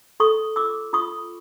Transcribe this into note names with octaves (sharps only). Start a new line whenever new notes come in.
A4 C#6 D#6
F4 D6 E6
F4 C#6 D#6